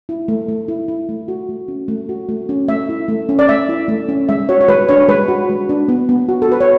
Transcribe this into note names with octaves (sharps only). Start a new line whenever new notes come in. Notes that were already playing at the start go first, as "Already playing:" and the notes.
E4
A3
A3
E4
E4
A3
F#4
A3
C#4
A3
F#4
A3
C#4
A3 E5
E4
A3
C#4
D5
A3 E5
E4
A3
C#4
G#3 E5
F#4 C#5
C#5
G#3 B4
D4 C#5
G#3 B4
F#4
G#3
D4
B3
B3
F#4
A4
F#4 B4
C#5